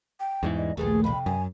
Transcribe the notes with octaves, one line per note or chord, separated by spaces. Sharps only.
G5
E2 G#2 E3 G3 C#4
D#5
A#1 D#2 A3 B3 G#4 A4
F2 C3 B5
F#2 G#5